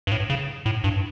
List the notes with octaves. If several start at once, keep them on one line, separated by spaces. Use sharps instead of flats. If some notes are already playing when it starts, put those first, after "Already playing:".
G2
A2
C#3
A2
G2